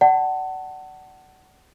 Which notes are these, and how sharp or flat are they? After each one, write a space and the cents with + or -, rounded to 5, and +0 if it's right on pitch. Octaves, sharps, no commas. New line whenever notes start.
D5 +15 F#5 +25 A5 +15